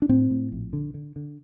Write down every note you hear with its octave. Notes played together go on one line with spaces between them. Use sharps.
D4
A2 C4
A2
A#1
D3
D3
D3